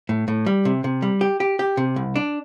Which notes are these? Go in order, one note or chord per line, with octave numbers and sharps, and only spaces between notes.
A2
A2
G3
C3
C3
G3
G4
G4
G4
C3
C2
D4